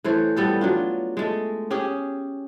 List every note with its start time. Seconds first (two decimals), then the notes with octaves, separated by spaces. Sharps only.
0.04 E3 A3 C5 C#5
0.36 G3 B3 A4
0.61 F#3 D4 F4
1.17 G#3 A3
1.71 C#4 G4 G#4